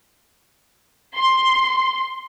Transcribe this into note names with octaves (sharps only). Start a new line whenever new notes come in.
C6